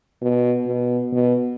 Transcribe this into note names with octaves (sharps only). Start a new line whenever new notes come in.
B2
B2
B2